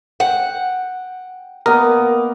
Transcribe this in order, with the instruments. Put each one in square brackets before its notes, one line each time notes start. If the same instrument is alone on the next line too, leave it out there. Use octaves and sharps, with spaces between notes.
[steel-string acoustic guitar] F#5 [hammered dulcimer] G5
[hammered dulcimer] A#3 B3 D#5 [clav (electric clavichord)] A#4